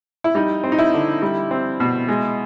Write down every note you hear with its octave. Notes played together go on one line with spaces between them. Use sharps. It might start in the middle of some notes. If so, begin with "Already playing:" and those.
E4
G3 D#4
C4
D#4
E4
D3
G3
C4
B2
G#3